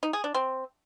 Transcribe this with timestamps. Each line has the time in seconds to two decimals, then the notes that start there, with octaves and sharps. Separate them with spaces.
0.03 D#4
0.13 G#4
0.24 D4
0.35 C4